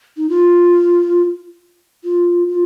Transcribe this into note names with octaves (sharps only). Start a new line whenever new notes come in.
D#4
F4
F4
F4